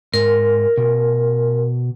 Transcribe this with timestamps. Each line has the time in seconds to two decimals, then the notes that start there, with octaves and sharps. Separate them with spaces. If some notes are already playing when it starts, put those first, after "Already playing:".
0.14 G#2 A#4
0.77 B2